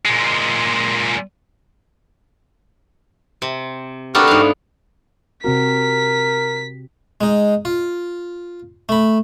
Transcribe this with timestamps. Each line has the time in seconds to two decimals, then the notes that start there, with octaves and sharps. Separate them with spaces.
0.05 A#2 G#3
3.42 C3
4.15 A3 B3 D4 F#4 G4 A#4
4.27 G#2 F5
5.44 C3 C4 F#4 A#4 B6
7.21 G#3 D#4
7.65 F4
8.89 A3 B5